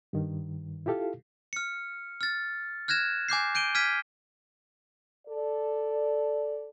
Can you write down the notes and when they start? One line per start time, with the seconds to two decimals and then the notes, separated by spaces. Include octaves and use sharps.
0.13 G2 D#3
0.86 E4 F4 G4 A4 F5
1.53 F6 C#7
2.21 F6 A6
2.88 F6 F#6 G#6 A#6 E7
3.29 G#5 D6 G6 C7
3.55 G6 D7 D#7 G7
3.75 F6 G#6 B6 D#7
5.27 A4 D5